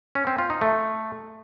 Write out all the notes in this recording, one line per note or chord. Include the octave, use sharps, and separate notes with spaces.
C#4
C4
F4
D#4
A3